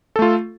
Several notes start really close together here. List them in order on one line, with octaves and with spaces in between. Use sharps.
A4 A3 F4